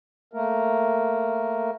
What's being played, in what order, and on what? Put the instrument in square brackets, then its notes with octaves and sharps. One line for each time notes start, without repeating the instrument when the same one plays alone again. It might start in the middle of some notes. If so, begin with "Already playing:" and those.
[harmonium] A3 A#3 A#4